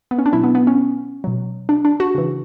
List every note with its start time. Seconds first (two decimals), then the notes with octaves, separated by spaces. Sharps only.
0.11 B3
0.19 C#4
0.26 D4
0.33 B2 F#3 E4
0.44 B3
0.55 B3
0.67 C#4
1.24 B2 F#3
1.69 D4
1.85 D4
2.00 F#4
2.15 C#3 E3